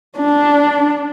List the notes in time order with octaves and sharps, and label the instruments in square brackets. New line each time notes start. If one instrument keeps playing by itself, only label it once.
[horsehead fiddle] D4